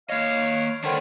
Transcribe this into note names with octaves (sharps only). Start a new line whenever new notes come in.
A#3 C#5 D#5 F5
D3 D#3 D4 C5 C#5